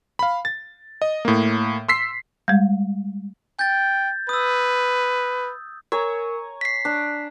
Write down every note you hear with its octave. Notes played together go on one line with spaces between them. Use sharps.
F5 B5
A6
D#5
A2 A#3
C6 E6 B6 C7
G3 G#3
G5 G6 A6
B4 D#6 E6
A#4 C#5 G#5 A#5
B6 C7
D4